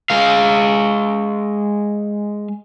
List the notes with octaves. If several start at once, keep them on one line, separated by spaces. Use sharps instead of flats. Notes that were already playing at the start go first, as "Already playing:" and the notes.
G#3 F5